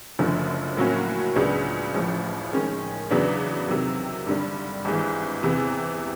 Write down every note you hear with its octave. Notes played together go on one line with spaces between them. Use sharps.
F#1 F#2 D3 F3 A3
A2 F#3 A#3 C#4 F#4
C#2 C#3 F#3 B3 D4
A1 A2 F3
D#3 G#3 C#4
E2 C#3 F#3 B3 D4
C3 D#3 F#3
G2 D3 G3
G#1 G2 E3 G#3
E2 C3 E3